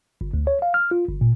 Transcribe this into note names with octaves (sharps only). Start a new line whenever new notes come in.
G1
D2
C#5
F5
F6
F4
G1
A#2